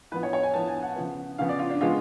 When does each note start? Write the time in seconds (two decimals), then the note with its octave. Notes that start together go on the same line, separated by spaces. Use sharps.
0.12 A2 F3 B3 B4
0.23 C#5
0.33 C#5
0.43 G#5
0.54 A2 F3 B3 A5
0.68 G#5
0.83 F#5
0.96 C#3 F3 B3
1.38 C#3 F3 B3 F5
1.49 D5
1.59 F4
1.70 D4
1.81 C#3 F3 G#3 B3 F4